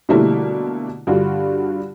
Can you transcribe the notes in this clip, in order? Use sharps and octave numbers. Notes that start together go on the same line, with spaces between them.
B2 D3 G3 A3 A#3 E4
G2 D3 F4 F#4